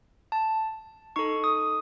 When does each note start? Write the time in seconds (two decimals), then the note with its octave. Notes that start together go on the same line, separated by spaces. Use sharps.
0.32 A5
1.16 D#4 A4 C#6
1.44 D#6